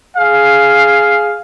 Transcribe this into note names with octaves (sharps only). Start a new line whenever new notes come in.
G#4 F5